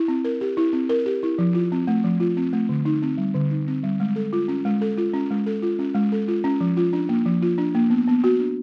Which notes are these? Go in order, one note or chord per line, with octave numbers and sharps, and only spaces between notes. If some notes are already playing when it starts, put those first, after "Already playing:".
Already playing: E4
C4
A#4
G4
E4
C4
A#4
G4
E4
F3
F4
C4
A3
F3
F4
C4
A3
D3
D#4
C4
G3
D3
D#4
C4
G3
G#3
A4
F4
C#4
G#3
A4
F4
C#4
G#3
A4
F4
C#4
G#3
A4
F4
C#4
F3
F4
D4
A#3
F3
F4
D4
A#3
B3
B3
F#4
D4